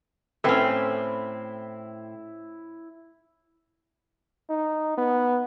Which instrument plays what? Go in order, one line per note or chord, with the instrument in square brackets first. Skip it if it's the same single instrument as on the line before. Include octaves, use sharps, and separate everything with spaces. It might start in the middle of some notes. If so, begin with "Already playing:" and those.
[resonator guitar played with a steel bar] A2 C4 [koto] C#4 E5 [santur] E4 [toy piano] A4 B4 G5
[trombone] D#4
B3